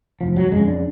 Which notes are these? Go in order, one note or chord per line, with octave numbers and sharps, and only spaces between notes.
F1 F3
F#3
F2 C#3 G#3
D4